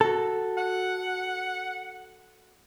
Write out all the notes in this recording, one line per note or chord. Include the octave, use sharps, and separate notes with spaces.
F#4 A4
F#5